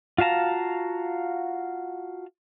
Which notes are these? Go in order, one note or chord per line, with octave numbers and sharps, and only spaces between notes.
F4 F#4 F5 A5 A#5